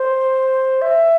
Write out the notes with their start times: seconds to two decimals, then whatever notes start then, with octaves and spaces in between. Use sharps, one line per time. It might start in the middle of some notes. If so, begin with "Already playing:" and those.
Already playing: C5
0.82 E5